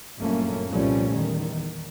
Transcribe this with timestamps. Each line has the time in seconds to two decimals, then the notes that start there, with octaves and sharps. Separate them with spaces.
0.20 G1 F#2 A#2 A3 A#3 C#4
0.68 C2 A#2 F3 G3 A3 C#4
1.13 E2 D#3